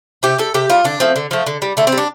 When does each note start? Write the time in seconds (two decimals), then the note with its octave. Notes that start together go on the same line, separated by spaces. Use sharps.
0.23 C3 G4
0.38 G3 A4
0.54 C3 G4
0.70 G3 F4
0.84 D3 D4
1.00 F3 A3 C4
1.16 D3
1.31 F3 A3
1.46 D3
1.62 G3
1.77 D3 A3
1.87 C4
1.92 G3
1.98 D4